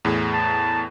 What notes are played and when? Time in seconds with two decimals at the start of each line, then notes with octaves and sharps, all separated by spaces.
0.05 E2 A2 G#4
0.34 A5